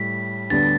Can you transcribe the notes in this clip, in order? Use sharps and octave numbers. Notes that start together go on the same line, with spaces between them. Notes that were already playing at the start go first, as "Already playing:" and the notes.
Already playing: A2 G3 B6
D2 D3 G3 B3 D4 A6